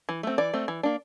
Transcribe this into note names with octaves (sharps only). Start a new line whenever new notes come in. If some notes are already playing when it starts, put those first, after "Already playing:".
E3
A3 C4
E3 D5
A3 C4
E3
A#3 D4